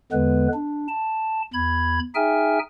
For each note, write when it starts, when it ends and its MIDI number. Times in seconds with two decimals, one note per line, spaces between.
0.12 0.48 40
0.12 0.48 50
0.12 0.48 56
0.12 0.48 59
0.12 0.48 71
0.53 0.87 62
0.88 1.42 81
1.53 1.99 40
1.53 1.99 83
1.53 1.99 92
2.15 2.59 63
2.15 2.59 68
2.15 2.59 76
2.15 2.59 79
2.15 2.59 80
2.15 2.59 89